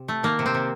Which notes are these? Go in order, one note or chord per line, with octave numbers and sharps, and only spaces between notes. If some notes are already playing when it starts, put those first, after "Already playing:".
Already playing: C3
A3
D#3 A#3
C3
C4
C3